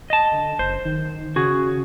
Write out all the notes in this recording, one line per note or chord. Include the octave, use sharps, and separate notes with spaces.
D#5 A5
D3
F#1 C5
D#3
C#3 F#4 G#4